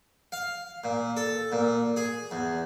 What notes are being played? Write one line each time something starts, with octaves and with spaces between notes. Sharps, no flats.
F5
A#2
A4
A#2
G#4
E2